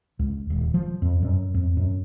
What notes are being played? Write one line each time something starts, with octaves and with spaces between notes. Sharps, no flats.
C#2
D#1
F3
F2
F#2
F2
F#2